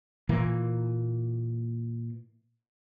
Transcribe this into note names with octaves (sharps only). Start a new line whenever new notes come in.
A#2 E3 A#3